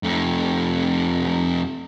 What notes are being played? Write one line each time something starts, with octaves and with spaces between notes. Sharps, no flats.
F2 A3